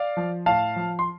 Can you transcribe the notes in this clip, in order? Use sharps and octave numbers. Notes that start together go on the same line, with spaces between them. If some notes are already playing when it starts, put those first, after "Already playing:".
Already playing: D5 F5
F3
A2 F5 A5
F3
C6